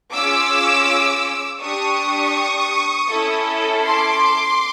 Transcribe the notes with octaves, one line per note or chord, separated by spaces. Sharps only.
C#4 F4 G#4 D6 E6
D4 G4 C#6 D#6
C#4 E4 A4
C6 D6